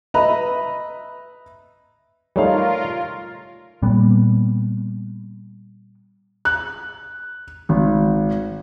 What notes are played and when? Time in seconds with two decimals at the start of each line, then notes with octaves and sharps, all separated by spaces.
0.14 B4 D#5 E5 A#5 B5
2.36 G3 A3 D#4 F4 A#4 C#5 F5
3.83 A#2 G3 B3
6.45 F#6
7.69 G#1